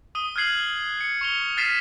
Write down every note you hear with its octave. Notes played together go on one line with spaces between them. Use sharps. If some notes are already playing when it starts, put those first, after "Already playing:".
D#6 D#7 G7
F6 F#6 G#6 C7 F#7
C#7
C#6 F7 G7
F6 A6 B6 C7 D#7 E7